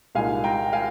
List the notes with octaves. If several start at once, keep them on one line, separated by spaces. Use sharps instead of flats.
C2 A#2 G#3 D#4 F5 G#5
G5 A#5
F5 G#5